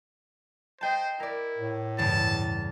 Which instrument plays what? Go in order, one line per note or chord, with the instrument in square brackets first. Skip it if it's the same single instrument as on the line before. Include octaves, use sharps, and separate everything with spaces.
[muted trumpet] C5 [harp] D#5 G5 A5
[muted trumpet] E4 [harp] A#4 D5
[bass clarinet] A2
[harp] E2 G2 C#3 [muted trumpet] A5